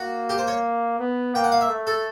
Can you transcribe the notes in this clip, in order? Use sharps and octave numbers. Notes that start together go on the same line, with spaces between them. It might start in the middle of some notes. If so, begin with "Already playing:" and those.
Already playing: A#3 F#4
G4
C5
C#5
B3
A#3 G5
F#5
F5
E5
A3
A4